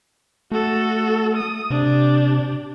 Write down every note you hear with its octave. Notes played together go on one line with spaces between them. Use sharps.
A3 F#4 A4
D#6
C3 D4 G4